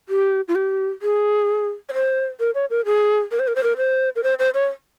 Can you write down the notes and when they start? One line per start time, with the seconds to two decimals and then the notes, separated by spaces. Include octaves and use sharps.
0.09 G4
0.48 F4
0.55 G4
1.02 G#4
1.89 C#5
1.93 C5
2.40 A#4
2.55 C#5
2.70 A#4
2.86 G#4
3.31 A#4
3.39 C5
3.47 A#4
3.55 C5
3.63 A#4
3.77 C5
4.16 A#4
4.23 C5
4.39 C5
4.54 C#5